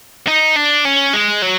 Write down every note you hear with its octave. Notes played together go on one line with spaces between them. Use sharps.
D#4
D4
C#4
G#3
F#3